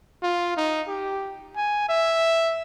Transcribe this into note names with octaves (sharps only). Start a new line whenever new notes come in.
F4
D#4
G4
G#5
E5